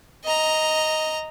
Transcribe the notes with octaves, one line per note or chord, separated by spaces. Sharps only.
D#5 A#5